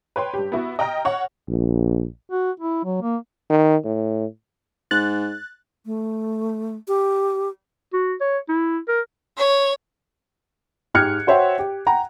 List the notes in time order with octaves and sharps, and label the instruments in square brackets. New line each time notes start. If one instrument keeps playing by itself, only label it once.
[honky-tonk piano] B4 C#5 G5 C6
G2 G4
B3 E4 F#4
D#5 G5 A#5 F6 A#6
C#5 F#5 C#6
[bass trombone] A#1
[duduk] F#4
E4
F#3
A#3
[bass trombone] D#3
A2
[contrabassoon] G#2 [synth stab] F#6 A6
[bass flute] A3
G4
[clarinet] F#4
C#5
E4
A#4
[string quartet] C#5
[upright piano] G#2 G4 F6 F#6 G#6 C#7
F#4 C5 C#5 E5 F#5 G5
G4
F#5 G5 A#5